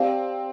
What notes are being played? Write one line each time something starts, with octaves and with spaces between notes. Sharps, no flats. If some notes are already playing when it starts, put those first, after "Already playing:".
Already playing: C4 G4 D5 F5 A5